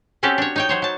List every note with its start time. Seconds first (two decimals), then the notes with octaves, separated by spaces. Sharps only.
0.23 C4 C#4 F#4 G4 A4
0.38 D4 C#5
0.56 D#4 C#5 G5
0.69 F#3 C5 C#5
0.82 F#3 A5